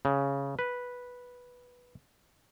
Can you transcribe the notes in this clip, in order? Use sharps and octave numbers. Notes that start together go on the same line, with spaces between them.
C#3
B4